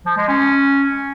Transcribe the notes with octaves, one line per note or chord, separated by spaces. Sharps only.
F3
G#3
C#4